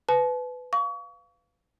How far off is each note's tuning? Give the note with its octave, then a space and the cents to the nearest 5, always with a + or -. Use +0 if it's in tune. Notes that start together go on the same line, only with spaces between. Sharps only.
B4 +15 A5 -40
F5 +0 C#6 +35